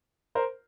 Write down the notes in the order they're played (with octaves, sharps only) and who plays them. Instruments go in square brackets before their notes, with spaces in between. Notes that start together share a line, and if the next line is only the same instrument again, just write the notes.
[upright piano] A#4 C5